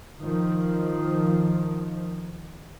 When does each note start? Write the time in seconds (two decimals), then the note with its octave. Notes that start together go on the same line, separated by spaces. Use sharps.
0.22 D#3 F3